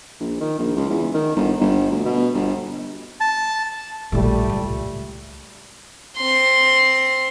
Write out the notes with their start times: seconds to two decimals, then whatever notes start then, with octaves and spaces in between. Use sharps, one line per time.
0.20 A#1
0.40 D#3
0.59 A#1
0.76 C#2
0.90 E2
1.14 D#3
1.36 G1
1.60 G1
1.91 D2
2.05 B2
2.33 G1
3.21 A5
4.12 A#1 A2 G3 A3
4.49 C#2
6.17 C4 C6